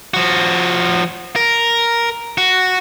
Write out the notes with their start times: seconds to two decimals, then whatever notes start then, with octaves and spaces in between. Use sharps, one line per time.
0.14 F3 F#4
1.36 A#4
2.38 F#4